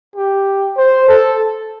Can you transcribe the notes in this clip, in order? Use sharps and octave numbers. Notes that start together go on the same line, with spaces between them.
G4
C5
A4